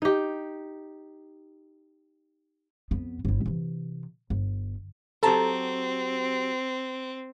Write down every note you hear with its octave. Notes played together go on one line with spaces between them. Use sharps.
D#4 G4
F2 B3
G1 E4
C3 E3
G1
F#3 C4 G4 A4 A5 A#5